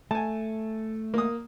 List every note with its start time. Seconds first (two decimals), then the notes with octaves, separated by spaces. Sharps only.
0.11 A3 G#5 A5
1.14 A#3 D#6